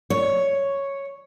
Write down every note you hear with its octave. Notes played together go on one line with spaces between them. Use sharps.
C#5